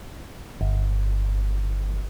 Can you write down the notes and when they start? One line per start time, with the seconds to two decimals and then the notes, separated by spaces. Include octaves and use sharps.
0.61 G1